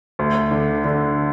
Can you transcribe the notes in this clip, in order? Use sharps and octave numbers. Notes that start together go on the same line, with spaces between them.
D2
D3
D3